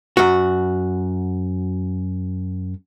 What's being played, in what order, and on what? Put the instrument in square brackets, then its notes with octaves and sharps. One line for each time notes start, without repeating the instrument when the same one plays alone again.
[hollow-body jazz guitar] F#2 F#4